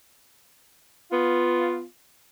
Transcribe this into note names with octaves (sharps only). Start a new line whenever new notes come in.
B3 F4